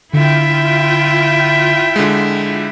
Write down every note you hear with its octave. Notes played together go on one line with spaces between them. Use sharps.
D3 E4 F4 E5 G5
D3 G#3